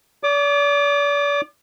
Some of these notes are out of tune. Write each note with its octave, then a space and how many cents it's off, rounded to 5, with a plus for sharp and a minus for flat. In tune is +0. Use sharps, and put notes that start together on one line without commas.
D5 -40 D6 +30